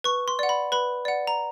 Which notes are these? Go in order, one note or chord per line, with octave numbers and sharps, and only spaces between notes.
B4 C#6
C6
D5 F#5
B5
B4 B5
D5 F#5
A#5